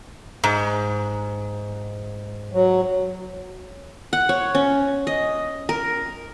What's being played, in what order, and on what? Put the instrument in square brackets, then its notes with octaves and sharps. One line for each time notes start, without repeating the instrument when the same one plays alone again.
[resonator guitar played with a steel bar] G#2
[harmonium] F#3
[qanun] F#5
C#5
C#4
D#5
A#4